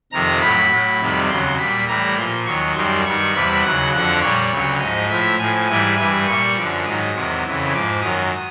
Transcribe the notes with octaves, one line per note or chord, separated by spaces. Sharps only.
F2 C3 D#3 A#5
A2 F#3 B5
A2 F#3
F2 C3 D#3 G3
D#2 C#3 F#3 C6
A#2 G3 B5
A2 E3 G3 A#5
A#2 F3 C6
D#2 D#3 F#3 C#6
F#2 D#3 G3 C6
G2 D#3 G3 C#6
E2 C3 E3 G3 B5
D#2 C#3 F#3 F#5
F2 D3 F3 F#5
A#2 G3 C#5
D2 C#3 F#3
G#2 F3 D#5
A2 F3 E5
A2 F3 G#5
G#2 E3 G3 G#5
G2 E3 G3 G#5
A#2 G3 C#6
F#2 D3 F3 D6
G#2 D#3 F#3 D#6
E2 C3 D#3 F#3
F2 C#3 E3
G#2 F3 D6
F#2 D#3 F#3 D#6